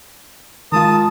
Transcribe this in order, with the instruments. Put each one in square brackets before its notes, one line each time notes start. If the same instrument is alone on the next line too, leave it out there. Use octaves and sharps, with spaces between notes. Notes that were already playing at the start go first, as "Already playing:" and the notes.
[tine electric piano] D#3 G#3 F4 [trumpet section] A#4 A5 [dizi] D#6